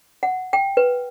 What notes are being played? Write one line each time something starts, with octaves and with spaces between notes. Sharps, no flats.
F#5
G5
B4